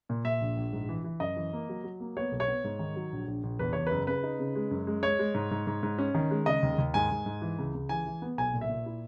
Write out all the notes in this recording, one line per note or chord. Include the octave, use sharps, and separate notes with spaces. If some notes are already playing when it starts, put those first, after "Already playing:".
A#2
A#2 E5
A#1
A#1
G#2
E3
E3
F#2 D#5
E3
A#3
F#3
F#3
A#3
B3 C#5
B1
C#5
B3
G#2
D#3
F#3
A#1
A#1
A#1
E2 B4
E2 C#5
F#1 B4
C#3 B4
D#4
C#3
G#3
F#2
G#3
G#3 C#5
G#3
G#2
G#2
G#2
G#2
C#4
D#3
G#3
C#3 D#5
D#2
D#2
G#2 G#5
G#2
G#2
E3
C#2
C#2
E3 G#5
E3
B3
B1 G#5
A#2
E5
A#2
E4